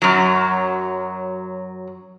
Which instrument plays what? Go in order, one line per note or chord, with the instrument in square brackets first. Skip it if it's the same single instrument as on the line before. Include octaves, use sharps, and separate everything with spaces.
[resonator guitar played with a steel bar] F#2 F#3